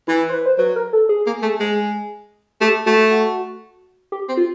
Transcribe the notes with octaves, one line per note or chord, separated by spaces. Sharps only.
E3 E4
C5
B4
C5
F#3 B4
A#4
A4
G#4
A#3
A3
G#3
A3 G4
A3 F#4
F#4
G4
C4
F4